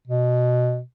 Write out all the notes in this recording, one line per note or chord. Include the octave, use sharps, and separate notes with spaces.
B2